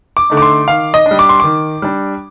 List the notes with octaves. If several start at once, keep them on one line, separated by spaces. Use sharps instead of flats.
D6
D3 A3 D#4
D6
C6
D#3 F5
D#5
D4
G3
D6
C6
D#3 D6
G3 D4